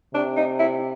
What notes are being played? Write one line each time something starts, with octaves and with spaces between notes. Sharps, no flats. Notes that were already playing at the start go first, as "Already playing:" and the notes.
C3 D4
D#4
E4